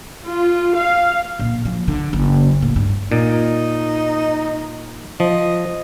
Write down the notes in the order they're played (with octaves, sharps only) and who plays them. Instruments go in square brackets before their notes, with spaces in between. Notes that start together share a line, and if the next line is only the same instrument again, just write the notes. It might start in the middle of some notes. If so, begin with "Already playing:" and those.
[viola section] F4
F5
[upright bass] A#1
F3
D3
F#1
A2
G2
[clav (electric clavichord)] A#2 [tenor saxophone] D#4
[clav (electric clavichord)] F3 [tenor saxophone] D#5